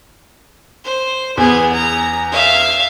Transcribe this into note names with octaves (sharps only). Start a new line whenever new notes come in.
C5
E2 B3 G#4
A#5
E5 F5